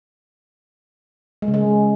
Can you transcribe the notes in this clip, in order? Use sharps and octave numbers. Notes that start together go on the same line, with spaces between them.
G#3
C#3
G#3